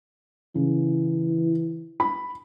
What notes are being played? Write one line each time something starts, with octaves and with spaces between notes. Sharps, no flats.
C#3 E3
B5